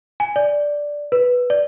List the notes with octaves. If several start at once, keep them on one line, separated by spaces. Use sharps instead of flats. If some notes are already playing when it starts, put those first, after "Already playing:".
G#5
D5
B4
D5